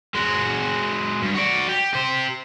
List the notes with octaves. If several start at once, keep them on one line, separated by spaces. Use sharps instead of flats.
G#3 F#4
G2
F#4 D5
G4
G4 C5